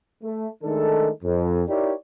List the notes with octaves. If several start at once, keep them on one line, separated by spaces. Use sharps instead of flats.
A3
D#3 G#3 A3 D4 D#4 A4
F2
D#4 E4 G4 A#4 C#5 D5